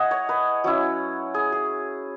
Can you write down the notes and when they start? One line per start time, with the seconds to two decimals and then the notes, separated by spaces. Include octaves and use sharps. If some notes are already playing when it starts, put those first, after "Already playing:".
Already playing: G#3 E4 D#5 F#5 G#5
0.11 C#5
0.29 B4
0.64 F#3 C#4 E4
1.34 G#4
1.52 G#4